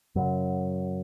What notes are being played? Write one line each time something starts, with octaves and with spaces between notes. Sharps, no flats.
F#2 C#3 F#3